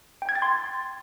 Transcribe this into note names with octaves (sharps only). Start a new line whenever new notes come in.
G5
G#6
A6
C6